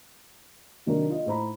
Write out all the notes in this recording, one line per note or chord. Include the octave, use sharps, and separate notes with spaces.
C3 D#3 F#3 D4 A#4
F4 D#5
A2 D#4 C5 A#5 B5